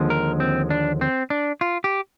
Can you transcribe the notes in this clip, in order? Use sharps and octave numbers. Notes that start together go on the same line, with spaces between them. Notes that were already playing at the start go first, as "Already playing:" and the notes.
Already playing: D#2 D3 F3 G#3
A#4
C4
D4
C4
D4
F4
G4